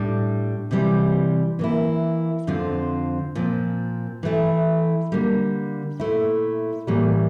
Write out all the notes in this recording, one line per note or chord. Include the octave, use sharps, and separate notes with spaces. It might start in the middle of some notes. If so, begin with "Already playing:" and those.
Already playing: A2 G3 D4
C3 E3 G3
E3 A#3 E4
F2 D3 F3 C4 F4
A#2 F3 C4
E3 A3 E4
D3 G3 A#3
A#2 A3 E4
A2 E3 G3 A#3